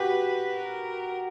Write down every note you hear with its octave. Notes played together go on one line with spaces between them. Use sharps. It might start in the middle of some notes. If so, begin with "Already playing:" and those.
Already playing: F#4 G4 B4
A#4